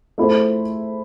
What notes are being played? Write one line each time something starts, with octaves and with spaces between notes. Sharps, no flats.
A3 E4 A4 C5